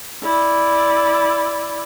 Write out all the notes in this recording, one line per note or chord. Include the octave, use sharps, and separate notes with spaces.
E4 D5